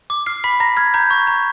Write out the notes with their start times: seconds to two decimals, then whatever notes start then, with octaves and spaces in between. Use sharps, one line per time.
0.10 D6
0.26 F6 C7
0.44 B5 B6
0.60 A#5 A#6
0.77 F6 G#6
0.94 A#5 G6
1.11 C#6
1.27 A#5